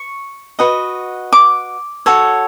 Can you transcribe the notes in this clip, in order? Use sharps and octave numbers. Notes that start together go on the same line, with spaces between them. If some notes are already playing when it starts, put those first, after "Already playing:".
Already playing: C#6
F#4 B4 D#5
D6
F#4 A4 C#5